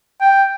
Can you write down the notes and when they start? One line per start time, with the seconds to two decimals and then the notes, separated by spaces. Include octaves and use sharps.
0.21 G5